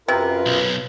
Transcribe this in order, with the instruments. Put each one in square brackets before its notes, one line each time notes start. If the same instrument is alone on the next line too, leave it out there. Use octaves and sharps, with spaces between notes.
[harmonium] F#2 F4 A#4 [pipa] C3 [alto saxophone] B4
[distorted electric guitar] B1